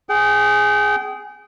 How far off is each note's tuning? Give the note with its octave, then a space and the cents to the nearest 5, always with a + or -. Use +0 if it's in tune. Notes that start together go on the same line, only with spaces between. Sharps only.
G#4 +0 G5 -35